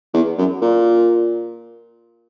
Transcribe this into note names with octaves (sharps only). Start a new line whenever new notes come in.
E2
F#2
A#2